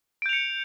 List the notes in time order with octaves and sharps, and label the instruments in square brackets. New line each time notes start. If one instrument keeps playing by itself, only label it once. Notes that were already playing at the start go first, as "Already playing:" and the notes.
[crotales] D7
G6
F7
C#7